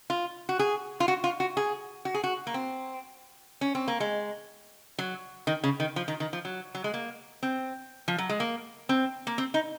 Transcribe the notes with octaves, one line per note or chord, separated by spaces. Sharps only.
F4
F#4
G#4
F4
F#4
F4
F#4
G#4
F#4
G#4
F#4
A#3
C4
C#4
C4
A#3
G#3
F#3
D#3
C#3
D#3
F3
D#3
D#3
F3
F#3
F#3
G#3
A#3
C4
F3
F#3
G#3
A#3
C4
A#3
C4
D#4